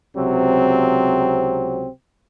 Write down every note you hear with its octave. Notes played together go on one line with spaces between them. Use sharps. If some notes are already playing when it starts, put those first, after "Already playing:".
C#2 C3 F#3 C4